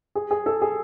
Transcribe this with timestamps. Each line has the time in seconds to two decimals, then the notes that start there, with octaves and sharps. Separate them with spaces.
0.15 G#4
0.31 G#4
0.46 A4
0.62 G#4